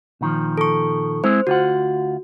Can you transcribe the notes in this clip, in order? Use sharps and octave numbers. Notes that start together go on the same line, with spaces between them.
A#2 D#3 F3
A4 C#6
G#3 C4 E4 C5
D2 F4 F#4 F#5